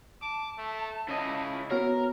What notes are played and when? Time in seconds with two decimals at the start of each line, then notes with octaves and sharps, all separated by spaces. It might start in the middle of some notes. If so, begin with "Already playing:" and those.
0.22 A5 D6
0.58 A3
1.09 C#3 E4 D#5
1.71 B3 F#4 A#4 C#5